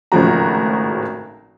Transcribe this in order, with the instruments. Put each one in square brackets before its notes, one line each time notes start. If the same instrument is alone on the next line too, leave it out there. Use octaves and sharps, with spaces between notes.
[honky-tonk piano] G#1 A2 C#3 F3 F#4 A#5